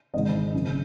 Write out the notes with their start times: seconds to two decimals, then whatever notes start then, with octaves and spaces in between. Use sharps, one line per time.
0.13 G#1 G#2 D#3 D#5
0.54 F#1 F#2 C#3